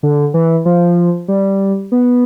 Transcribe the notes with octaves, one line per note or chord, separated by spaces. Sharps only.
D3
E3
F3
G3
B3